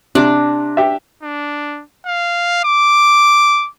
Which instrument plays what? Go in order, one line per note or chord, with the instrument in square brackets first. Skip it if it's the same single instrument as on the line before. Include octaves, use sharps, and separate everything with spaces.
[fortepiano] C3 [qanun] D4
[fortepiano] G4 E5
[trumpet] D4
F5
D6